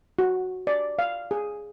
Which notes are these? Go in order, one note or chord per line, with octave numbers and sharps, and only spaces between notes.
F#4
D5
F5
G#4